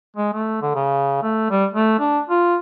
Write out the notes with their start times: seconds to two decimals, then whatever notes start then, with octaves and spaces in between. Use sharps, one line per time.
0.17 G#3
0.33 A3
0.62 D3
0.75 C#3
1.23 A3
1.51 G3
1.74 A3
1.99 D4
2.29 F4